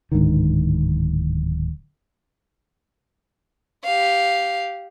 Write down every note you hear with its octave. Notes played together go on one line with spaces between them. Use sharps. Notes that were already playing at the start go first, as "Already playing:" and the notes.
D1 G#2 D3 D#3
G4 F5